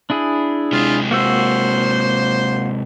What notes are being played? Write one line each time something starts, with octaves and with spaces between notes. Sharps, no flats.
D4 E4 G#4
C3 G#3 F4
A#3 F#4 C5 E6